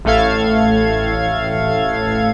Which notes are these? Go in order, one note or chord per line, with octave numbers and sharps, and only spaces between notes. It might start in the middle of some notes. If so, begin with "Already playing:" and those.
A1 A2 A3 A4 F5 G#6